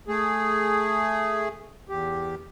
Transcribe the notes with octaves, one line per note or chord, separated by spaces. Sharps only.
A3 G#4
E2 G4